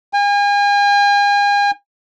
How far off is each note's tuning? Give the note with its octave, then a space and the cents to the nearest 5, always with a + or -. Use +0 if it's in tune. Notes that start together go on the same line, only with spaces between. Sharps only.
G#5 -40